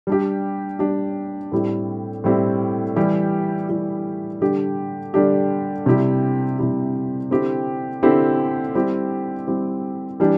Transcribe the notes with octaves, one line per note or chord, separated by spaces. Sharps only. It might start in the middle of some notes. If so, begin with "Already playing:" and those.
G3 D4 G4
G3 D4 G4
A2 G3 C4 E4 G4
A2 G3 C4 E4 G4
E3 G3 E4 G4
E3 G3 E4 G4
D3 G3 D4 G4
D3 G3 D4 G4
C3 G3 E4 G4
C3 G3 E4 G4
D3 C4 E4 G4
D3 C4 E4 G4
G3 C4 E4 G4
G3 C4 E4 G4
E3 G3 D4 G4